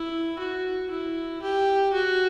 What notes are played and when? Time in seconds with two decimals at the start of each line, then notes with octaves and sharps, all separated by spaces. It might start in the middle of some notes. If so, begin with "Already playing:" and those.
Already playing: E4
0.39 F#4
0.91 E4
1.42 G4
1.93 F#4